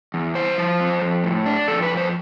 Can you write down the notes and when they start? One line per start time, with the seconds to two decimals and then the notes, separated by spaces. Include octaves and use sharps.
0.14 E2
0.35 E4 C5
0.58 F3
0.80 F2
1.02 F2
1.24 A2
1.46 D4
1.68 F2 A4
1.83 B4
1.90 F2
1.97 C5